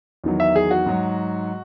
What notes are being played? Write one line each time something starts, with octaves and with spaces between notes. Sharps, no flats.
E2 D#3 F#3
E5
G#4
F#4
G#2 F#3